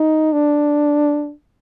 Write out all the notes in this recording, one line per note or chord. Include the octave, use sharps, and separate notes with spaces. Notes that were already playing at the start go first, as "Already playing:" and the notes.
Already playing: D#4
D4